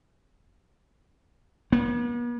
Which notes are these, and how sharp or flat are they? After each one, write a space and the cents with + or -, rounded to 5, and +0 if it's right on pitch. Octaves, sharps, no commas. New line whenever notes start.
B3 -45